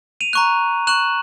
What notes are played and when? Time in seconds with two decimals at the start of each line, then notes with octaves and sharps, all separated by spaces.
0.21 D#7 F7
0.33 A#5 C#6 F#6
0.87 C#6 F#6 E7 F#7